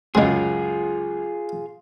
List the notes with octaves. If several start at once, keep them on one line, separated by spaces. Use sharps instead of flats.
C#2 F#2 G#3 F4 G#4 C6